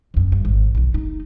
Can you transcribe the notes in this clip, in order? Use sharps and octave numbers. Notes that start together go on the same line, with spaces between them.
F#1 F#2
G2
G#1
B1 D#3
F1 D#4